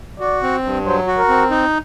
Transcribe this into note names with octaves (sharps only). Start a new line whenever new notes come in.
F#4 D5
C4
G2
F#3 C5
F#4
A#4
C4
D#4